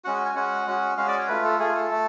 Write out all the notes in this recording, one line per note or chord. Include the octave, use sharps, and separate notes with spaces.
G#3 C#4 F#4 F#5
G#5
G#3 C#4 F#4 F#5
G#3 C#4 F#4
G#3 C#4 F#4 F5
D5
C#5
A3 F4 B4
A4
A3 F4 G#4
A4
A3